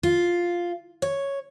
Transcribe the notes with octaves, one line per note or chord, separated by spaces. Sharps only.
F4
C#5